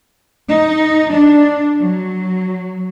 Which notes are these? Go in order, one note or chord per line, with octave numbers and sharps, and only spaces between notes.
D#4
D4
F#3